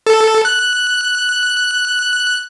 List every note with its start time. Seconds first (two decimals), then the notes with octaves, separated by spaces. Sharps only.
0.07 A4
0.45 F#6